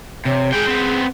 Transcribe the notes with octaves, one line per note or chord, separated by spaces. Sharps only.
C3 C#5
G#3 G#4 G5
B3 C4